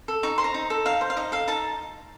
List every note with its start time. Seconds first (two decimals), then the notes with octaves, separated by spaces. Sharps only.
0.08 A4
0.23 D#4 C#6
0.38 C5 C6
0.44 A#5
0.54 D#4
0.70 A4
0.85 D#4 F5
1.01 C5
1.10 F5
1.16 D#4 D#5
1.32 A4 F5
1.48 D#4 A5